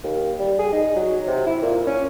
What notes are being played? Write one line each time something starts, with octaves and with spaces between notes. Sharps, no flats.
D#2
G3
G#4
D#4
F#3
C3
E4
A#2
C#4